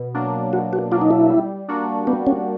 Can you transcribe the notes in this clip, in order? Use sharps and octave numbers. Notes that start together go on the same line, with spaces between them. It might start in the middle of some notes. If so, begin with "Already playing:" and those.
Already playing: B2
F#3 A#3 D4
B2 F#4
F#4
F#3 A#3 D4 F4
D#4
E4
G3
A#3 D4 F#4
G3 B3
C#4